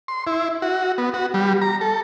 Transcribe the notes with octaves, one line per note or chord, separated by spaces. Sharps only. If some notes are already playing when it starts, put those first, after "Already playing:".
C6
E4
F#4
B3
F#4
G3
A#5
A4